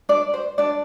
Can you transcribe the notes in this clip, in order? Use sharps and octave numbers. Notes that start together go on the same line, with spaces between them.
D4 D5
C5
D4 D5